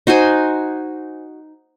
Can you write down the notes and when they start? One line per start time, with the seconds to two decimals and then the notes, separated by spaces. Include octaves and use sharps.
0.07 D#4 F#4 C5 G#5